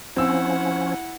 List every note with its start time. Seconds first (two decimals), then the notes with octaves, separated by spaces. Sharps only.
0.16 F3 C4 C#4 E4 F#5 E6